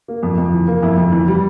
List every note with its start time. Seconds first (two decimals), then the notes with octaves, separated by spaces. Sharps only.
0.08 A#3
0.23 F2
0.38 F2
0.53 E3
0.68 A#3
0.83 F2 E4
0.97 F2
1.12 E3
1.28 G3